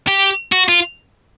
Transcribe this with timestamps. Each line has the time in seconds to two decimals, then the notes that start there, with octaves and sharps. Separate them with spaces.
0.08 G4
0.52 F#4
0.69 F4